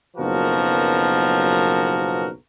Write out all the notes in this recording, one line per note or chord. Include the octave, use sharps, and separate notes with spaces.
F#1 B1 B2 F3 F#4 A#4